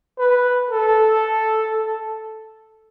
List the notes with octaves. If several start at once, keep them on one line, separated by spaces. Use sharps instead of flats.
B4
A4